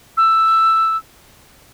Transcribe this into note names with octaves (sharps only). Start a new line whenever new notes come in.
E6